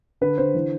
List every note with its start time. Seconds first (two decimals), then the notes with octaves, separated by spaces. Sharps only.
0.21 D3 B4
0.38 D3 C5
0.55 E3